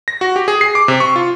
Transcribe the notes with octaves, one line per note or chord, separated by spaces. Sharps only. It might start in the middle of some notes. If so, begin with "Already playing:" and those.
A#6
F#4
G4
G#4
C7
D6
C3
C#6
F4